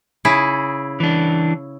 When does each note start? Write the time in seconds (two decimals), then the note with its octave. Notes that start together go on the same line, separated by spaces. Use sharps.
0.25 C#3 E4 G#4
1.00 E3 D4